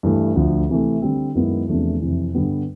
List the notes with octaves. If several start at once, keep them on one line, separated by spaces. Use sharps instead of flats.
G2 E3 A3
D2 D3 F3
C3 E3 A3
D3 G3 C4
F#2 D#3 G#3 B3 E4
E2 C3 F3 A3 D4
F2 C3 E3
G2 D3 G3 B3